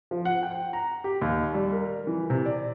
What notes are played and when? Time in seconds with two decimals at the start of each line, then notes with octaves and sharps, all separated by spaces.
0.11 F3
0.25 F#5
0.43 G5
0.73 A#5
1.04 G4
1.21 D#2
1.54 G3
1.72 A#4
2.07 E3
2.30 C3
2.46 D5